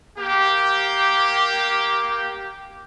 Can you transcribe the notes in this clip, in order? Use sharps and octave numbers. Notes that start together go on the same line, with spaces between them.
A#3 G4